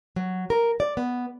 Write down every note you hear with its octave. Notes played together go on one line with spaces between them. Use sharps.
F#3
A#4
D5
B3